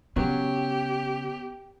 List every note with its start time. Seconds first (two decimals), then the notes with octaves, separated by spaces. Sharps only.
0.16 C#3 F#3 B3 C#4 G4